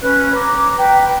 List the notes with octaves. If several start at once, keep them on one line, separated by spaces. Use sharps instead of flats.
C#4 B4 F#6
A#5 D6
B4 G5 A#5